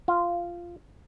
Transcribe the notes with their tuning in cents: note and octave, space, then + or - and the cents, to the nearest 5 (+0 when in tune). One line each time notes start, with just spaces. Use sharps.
F4 -10